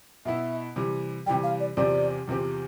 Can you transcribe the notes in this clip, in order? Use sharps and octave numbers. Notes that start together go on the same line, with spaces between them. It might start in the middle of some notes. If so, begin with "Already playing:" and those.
B2 B3 E4 E5
C3 E3 G3
C3 E3 G3 G5
F5
D5
E2 C3 F3 C4 G4 D5
E2 C3 F3 C4 G4